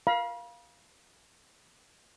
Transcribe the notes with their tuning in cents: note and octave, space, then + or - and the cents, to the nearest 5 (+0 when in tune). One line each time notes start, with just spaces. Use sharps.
F5 +0 B5 -45